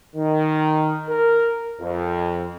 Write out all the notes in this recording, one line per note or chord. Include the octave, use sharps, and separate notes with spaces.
D#3
A#4
F2